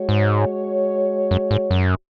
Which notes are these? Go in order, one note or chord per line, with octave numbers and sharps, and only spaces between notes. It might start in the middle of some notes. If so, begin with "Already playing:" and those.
Already playing: G#3 F#4 C#5
G#2
F#2
G#2
F#2